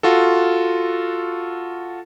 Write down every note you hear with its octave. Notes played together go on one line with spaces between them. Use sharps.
F4 F#4 A4